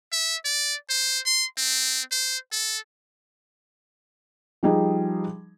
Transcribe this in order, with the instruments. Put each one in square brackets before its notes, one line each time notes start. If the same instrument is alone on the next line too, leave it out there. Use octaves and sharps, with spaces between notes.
[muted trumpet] E5
D5
C5
C6
C4
C5
A4
[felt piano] F3 G3 D#4 G#4